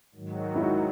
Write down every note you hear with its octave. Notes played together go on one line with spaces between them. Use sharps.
G#2 D#3 F#3
E4
D#4 F#4